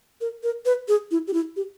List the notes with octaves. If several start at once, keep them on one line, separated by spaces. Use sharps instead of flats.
A#4
A#4
B4
G#4
E4
G4
E4
G4